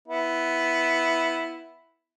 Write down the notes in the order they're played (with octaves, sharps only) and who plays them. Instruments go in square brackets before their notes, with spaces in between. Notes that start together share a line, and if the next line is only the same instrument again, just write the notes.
[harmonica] B3 E4